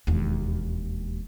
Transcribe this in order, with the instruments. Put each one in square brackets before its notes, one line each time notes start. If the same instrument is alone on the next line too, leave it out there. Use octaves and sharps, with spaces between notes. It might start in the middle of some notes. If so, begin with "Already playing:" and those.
[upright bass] E1 D#2